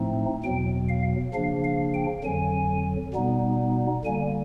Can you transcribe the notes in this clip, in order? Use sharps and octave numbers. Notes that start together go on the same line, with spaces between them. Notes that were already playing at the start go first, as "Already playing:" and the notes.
Already playing: A2 F3 A3 C4 D#4
E2 B2 F#3 G5
F5
C#3 F3 A#3 D4 F5
F5
G5
F2 D3 F#3 G#5
B2 G3 B3 D#4
D3 G3 A#3 G#5